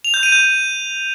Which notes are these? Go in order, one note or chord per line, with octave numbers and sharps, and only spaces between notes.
F7
G6
D#7
G6